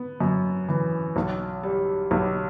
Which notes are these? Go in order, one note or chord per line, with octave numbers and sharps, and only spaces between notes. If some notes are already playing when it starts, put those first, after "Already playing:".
Already playing: B3
F#2
E3
B1
G3
B1